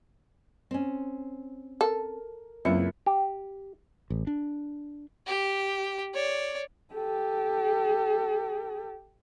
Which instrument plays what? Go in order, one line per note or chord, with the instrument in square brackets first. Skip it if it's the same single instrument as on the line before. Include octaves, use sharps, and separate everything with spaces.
[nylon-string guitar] C4 C#4
[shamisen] A4 [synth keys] A#4
[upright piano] C#2 E5 C#7 [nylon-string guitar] F#2 E4 [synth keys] A#3 C4
[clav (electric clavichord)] G4
[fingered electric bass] A1
D4
[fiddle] G4
C#5 D5
[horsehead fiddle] G4 A4